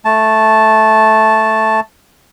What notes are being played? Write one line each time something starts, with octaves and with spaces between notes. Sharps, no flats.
A3 A5